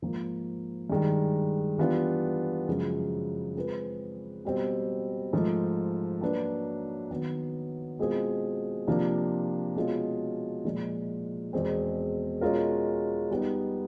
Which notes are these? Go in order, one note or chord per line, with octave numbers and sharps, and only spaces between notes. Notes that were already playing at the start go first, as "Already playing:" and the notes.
G#2 F3 A#3
G2 D#3 G#3
E3 G3 B3 D4 F4
F#2 C#3 F3 G#3
G#3 C4 F4 G#4 B4
B2 G3 C4
G#2 F3 A3
F#3 A#3 D4 F#4 B4
D#3 F#3 B3
B2 G#3 C4 F4 G#4
C3 F3 A#3 D4 F4
B2 G#3 C#4 F4 G#4
A#2 F3 G#3
E2 B2 G#3 C4
B2 G#3 C#4 F4 A#4
G3 B3 D#4